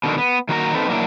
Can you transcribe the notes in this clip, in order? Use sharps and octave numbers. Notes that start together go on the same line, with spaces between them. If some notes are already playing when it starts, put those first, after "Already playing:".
B2 D3 D#3
B3
D#3 A#3 F#4 A#4 E5 A#5
C4 D#4 A4 B4
F#3 A#3 D4 E4